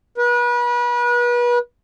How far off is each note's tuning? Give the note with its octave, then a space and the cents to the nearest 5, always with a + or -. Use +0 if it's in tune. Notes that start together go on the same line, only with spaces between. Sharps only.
B4 -35